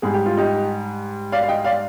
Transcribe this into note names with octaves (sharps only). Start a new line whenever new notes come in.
G#2 G3 G#4
G4
F4
D#4 G4
D5 F5
F5
D#5 G5
D5 F5